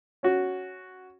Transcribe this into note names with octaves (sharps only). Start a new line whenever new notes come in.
C#4 F#4